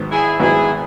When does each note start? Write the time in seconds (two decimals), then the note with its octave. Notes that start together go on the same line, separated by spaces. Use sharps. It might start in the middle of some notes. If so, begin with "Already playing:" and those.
Already playing: G#1 G#2 F#3 B3
0.10 E4 G#4
0.39 G#1 G#2 F#3 B3 E4 G#4